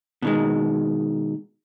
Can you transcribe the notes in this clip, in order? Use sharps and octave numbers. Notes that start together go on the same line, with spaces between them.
B2 D#3 G#3